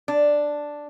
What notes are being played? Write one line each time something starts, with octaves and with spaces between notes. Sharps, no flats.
D4